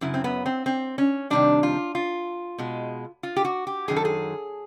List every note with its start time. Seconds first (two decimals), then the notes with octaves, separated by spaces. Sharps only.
0.01 F#2 C#3 F#3 E4
0.14 C4
0.24 B3
0.46 C4
0.66 C4
0.98 C#4
1.30 F2 C3 D#3 G3 D4
1.63 F4
1.95 F4
2.58 B2 G#3
3.23 F4
3.36 G4
3.45 F#4
3.67 G4
3.88 F#2 D#3 F#3 G#4
3.96 A4
4.05 G#4